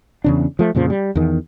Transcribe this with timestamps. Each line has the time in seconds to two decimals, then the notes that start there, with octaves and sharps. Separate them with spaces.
0.24 E2 C#3 D4
0.59 F3 A3
0.75 F2 A#2 C#3 F3
0.90 G3
1.15 E2 D#3